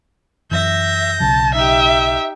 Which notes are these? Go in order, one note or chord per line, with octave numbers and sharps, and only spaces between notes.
F#2 E3 E5 G6 A#6
B1 C#3 F#3 A5
D#4 G4 E5